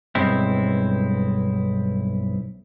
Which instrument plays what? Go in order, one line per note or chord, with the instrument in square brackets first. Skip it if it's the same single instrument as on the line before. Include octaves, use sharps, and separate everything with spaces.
[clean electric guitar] B1 G2 G#3 C4 E4